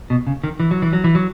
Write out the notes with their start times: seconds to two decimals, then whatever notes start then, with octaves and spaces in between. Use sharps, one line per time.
0.10 B2
0.27 C#3
0.44 D#3
0.60 E3
0.71 F#3
0.82 E3
0.93 F#3
1.04 E3
1.15 F#3